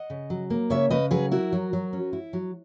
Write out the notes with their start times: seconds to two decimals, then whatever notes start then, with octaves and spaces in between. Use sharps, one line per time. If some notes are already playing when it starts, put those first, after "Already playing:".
Already playing: D#5 F#5
0.10 C#3
0.30 F#3
0.50 A#3
0.70 C#3 C#5 E5
0.90 C#3 B4 D#5
1.11 F#3 G#4 B4
1.31 E4 F#4 A#4
1.53 F#3
1.73 F#3
1.93 C#4
2.13 E4
2.33 F#3